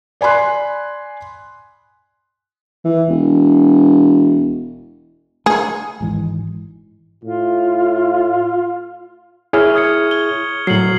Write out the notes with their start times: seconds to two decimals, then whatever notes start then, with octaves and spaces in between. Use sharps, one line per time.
0.21 D5 G#5 B5 C6 F#6
2.84 E3
3.08 E1
5.46 A3 G#4
6.00 G#1 G#2 E3
7.24 A2 F4
9.53 E4 G#4 C#5 C#6 F6
9.75 D#6 G#6 C#7
10.07 G#6 G7
10.67 A2 F#3 C7 F#7